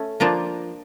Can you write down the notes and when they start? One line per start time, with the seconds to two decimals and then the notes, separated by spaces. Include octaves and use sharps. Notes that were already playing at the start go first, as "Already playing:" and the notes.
Already playing: A3 C#4
0.20 F3 A#3 D4 F4